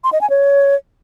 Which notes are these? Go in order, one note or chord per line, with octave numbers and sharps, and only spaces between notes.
C6
D#5
G#5
C#5